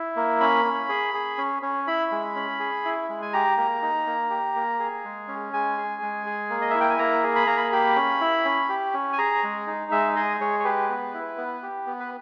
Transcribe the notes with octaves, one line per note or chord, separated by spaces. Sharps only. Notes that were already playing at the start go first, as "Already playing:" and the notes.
Already playing: E4
A#3
C#4 B5
C#4
G#4
G#4
C#4
C#4
E4 B5
G#3
C#4
G#4
E4
G#3
G#5
G4 A#5
A#3
D#4
A#3
G4
A#3
G#4
G#3
C#4
G#3 G#5
G#4
G#3
G#4
A#3
D#5
E4 E5
G5
G#5
A#3 A#5
G#4
B5
A#3 A#5
B5
G4 B5
C#4
E4
C#4
G4
C#4
G#5
G#4 A#5
G#3
D#4
G#3 E5
G#4 D#5
G#3 C#5
C#5
G4 B4
B3
E4
B3
G4
B3
B4